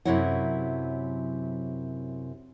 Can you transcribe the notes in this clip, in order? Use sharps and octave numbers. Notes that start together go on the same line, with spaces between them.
F#2 C3 F#3 E4 C#5 F#5